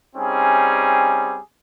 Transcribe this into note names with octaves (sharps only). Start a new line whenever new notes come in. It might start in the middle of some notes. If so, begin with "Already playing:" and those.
G3 C4 C#4 D#4 G#4